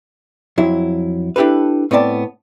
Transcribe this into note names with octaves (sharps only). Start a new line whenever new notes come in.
F2 F#3 E4
D4 E4 G4 A4 B4
A2 B3 C4 D5 A5